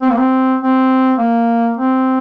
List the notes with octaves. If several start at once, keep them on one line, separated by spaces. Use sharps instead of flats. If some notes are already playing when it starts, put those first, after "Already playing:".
C4
A#3
C4
C4
A#3
C4